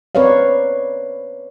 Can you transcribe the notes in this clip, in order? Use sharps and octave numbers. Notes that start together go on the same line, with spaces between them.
C4 A#4 B4 C#5 D5 F5